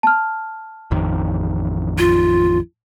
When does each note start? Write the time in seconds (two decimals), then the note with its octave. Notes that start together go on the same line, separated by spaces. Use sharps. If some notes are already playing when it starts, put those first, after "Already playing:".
0.03 A5 F6
0.91 A1 F2 D#3
1.98 F4